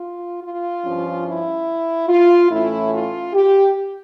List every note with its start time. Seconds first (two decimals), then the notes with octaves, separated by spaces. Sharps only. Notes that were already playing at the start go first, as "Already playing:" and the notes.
Already playing: F4
0.42 F4
0.84 G2 F3 C#4
1.25 E4
2.08 F4
2.50 A2 E3 A3 C#4 E4
2.92 F4
3.34 G4